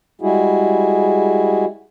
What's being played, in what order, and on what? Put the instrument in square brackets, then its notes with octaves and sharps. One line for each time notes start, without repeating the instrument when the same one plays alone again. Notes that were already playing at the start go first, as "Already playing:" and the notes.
[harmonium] G3 G#3 E4 F#4 G#4